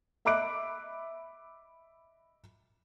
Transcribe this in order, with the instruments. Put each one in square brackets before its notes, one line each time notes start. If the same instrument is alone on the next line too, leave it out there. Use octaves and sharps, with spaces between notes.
[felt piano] D#5 E5 B5 D6 F#6 D7